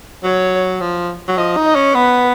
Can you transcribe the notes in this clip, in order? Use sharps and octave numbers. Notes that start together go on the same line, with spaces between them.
F#3 C#5
F3
F#3
F3 D#5
D#4
D#5
C#4
B3 B4